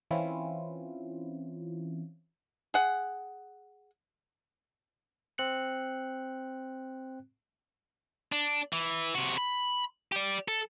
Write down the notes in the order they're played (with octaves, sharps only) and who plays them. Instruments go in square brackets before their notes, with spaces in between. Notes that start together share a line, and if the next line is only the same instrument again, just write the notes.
[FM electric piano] E3 C4 C#4 E4 F4
[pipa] G#4 F#5
[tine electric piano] C4 F#6 C#7
[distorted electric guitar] D4
E3
C3 F#4
B5
G4 D5
A4